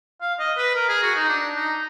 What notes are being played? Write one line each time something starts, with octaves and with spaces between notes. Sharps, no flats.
F5
D#5
B4
A#4
G#4
F#4
D#4
D4
D#4